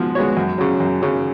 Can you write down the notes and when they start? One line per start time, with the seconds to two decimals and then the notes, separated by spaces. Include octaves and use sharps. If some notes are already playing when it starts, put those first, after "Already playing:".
Already playing: F3 G#3 B3 F#4
0.15 G#3 B3 F#4 C#5
0.37 F#2
0.58 C#3 F#3
0.80 F#2
1.02 C#3 F#3